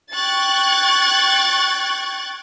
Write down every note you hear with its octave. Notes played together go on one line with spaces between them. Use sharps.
G5 C#6 F#6 G#6 A6